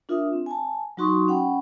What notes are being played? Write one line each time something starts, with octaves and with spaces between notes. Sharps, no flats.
D4 F4 A#4 E5 D#6
C4
G#5 A5
F#3 D#4 F#4 C6 C#6 D#6
C#4 F#5 G5 B5